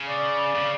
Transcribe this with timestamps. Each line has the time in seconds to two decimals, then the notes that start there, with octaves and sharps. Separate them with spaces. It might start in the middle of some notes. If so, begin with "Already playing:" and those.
Already playing: C#3
0.08 D5
0.55 C#3